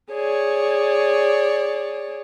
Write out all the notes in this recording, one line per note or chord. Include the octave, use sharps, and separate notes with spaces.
G#4 C#5 D5